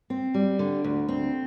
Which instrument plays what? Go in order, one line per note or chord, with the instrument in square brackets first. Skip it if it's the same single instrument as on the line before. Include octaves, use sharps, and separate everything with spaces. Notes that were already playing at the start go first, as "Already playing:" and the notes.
[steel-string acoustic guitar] C4
G3
D3
D2
C4